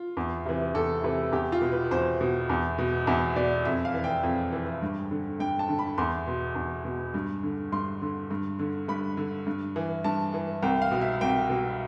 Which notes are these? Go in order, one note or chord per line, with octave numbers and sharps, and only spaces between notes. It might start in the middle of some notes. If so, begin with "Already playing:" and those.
Already playing: F4
E2
C3 E3
E2 A4
C3 E3 B4
E2 G4
F4
B2
B4
E2 C5
B2
E2
B2
E2 E5
B2 D5
F2 E5
F5
E3
G5
F2
E3
G2
D3
G2 G5
A5
D3
B5
E2 C6
B2
E2
B2
G2
D3
G2 C6
D3
G2
D3
G2 B5
D3
G2
E3
G2 A5
E3
C2 G5
F5
B2
E5
C2 G5
B2